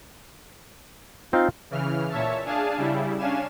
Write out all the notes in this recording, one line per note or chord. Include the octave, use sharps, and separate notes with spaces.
C4 D#4 F4
C#3 E3 F6
A#2 C#5 E5 A5
D4 G#4 F5 G#5 A5
C#3 G3 E4
C#4 D4 F5 G#5 E7